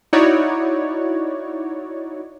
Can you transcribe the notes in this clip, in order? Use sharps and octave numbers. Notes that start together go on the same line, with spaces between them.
D#4 E4 F#4 C#5 D5